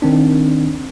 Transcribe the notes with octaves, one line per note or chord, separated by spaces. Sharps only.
D#3 C4 D4